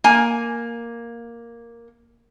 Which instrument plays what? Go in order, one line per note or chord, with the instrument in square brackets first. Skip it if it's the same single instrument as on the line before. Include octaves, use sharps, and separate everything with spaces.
[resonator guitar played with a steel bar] A#3 G#5